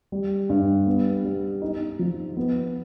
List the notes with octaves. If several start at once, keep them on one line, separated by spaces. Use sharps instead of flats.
G3
G2
B3
G3
D#4
F3
B3